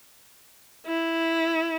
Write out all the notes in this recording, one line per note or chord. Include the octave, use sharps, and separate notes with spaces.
E4